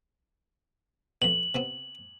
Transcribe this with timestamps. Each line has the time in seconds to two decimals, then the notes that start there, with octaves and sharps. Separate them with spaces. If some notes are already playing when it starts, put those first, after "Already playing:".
1.22 F2 B2 F#7
1.55 C3 B3 C4